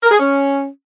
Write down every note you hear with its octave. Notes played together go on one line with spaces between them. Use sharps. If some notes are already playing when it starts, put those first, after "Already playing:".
A#4
G#4
C#4